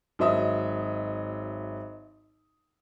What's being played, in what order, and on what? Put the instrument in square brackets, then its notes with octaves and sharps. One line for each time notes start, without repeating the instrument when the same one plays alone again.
[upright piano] G#1 F#3 D#5 E5 D#6